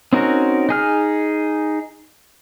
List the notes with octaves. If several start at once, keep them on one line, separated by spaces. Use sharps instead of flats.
C4 C#4 D#4 F#4 A#4
D#4 G#4 F6